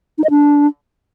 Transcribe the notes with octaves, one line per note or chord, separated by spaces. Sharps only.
D#4
D#5
D4